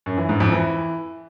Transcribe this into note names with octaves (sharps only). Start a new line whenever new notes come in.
F#2
E3
G#2
F2
E3